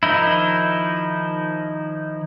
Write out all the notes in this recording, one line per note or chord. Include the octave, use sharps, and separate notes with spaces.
D#3 F3 D#4 E4